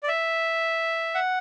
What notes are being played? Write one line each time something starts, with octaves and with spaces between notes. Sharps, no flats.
D5
E5
F#5